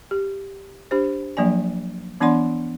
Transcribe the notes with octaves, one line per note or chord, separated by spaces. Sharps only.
G4
D4 G4 C5
F3 F#3 A#3 D4 D5 G#5
E3 B3 D4 D5 F#5 C6